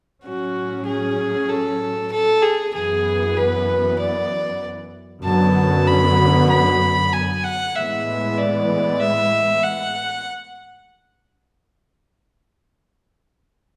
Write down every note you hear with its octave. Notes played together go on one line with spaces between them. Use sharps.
A2 F#3 C#4 F#4
G#4
A4
A4
G#4
F#2 E3 B3 G#4
B4
D5
F#2 D3 F#3 B3 A5
B5
B5
G#5
F#5
A2 E3 G#3 B3 E5
D5
E5
F#5